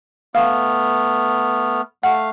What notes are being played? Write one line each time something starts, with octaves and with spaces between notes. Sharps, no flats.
A3 B3 F5 F6
A3 F5 F#5